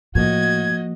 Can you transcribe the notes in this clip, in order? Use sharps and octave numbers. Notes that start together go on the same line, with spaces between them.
A2 F3 A#3 F#4 D#5 G#6